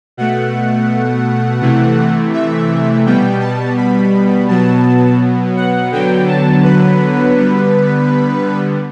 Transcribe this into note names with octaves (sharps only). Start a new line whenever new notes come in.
B2 A3 F#5
C3 E3 A3
E5
B2 G3 B3 G5
A5
B5
B2 F#3 B3 A5
F#5
D3 F#3 B3 G5
A5
B4
D3 G3 B3